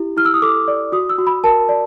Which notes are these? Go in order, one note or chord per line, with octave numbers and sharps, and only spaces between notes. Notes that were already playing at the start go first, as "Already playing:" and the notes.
Already playing: E4 G4
E4 F6
E6
D#6
A4 D6
D5
F#4 D#6
E6
F#4
B5
A#4 A5
D5